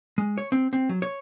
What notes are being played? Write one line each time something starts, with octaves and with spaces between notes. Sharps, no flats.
G#3
C#5
C4
C4
F#3
C#5